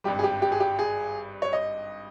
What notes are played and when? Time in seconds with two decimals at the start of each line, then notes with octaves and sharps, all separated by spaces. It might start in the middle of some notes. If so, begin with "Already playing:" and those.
0.04 G#1 G2 G3 G4
0.19 G#4
0.23 G4
0.42 G4
0.52 G#4
0.60 G4
0.79 G#4
1.42 C#5
1.53 D#5